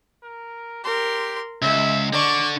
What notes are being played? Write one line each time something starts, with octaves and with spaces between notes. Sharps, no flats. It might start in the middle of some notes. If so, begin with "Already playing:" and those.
A#4
G4 A#4 C6
C#2 G#3 E5
D3 D5 C#6